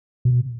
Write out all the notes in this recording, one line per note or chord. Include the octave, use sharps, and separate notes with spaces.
B2